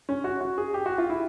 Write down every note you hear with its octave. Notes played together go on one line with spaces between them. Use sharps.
C#4
F#4
F#4
G#4
G4
F#4
F4
E4